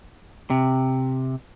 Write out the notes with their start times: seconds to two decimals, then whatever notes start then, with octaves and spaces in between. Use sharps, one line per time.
0.50 C3